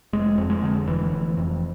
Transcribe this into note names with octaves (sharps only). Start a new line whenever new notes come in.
F1 G#3
F2
G#3
D3
F1 E3
F1
F2